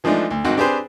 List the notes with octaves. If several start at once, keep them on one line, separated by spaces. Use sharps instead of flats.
E3 F3 G#3 A3 D4 D#4
D2
G#1 C4 D#4 F#4
C4 D4 G4 G#4 B4 C5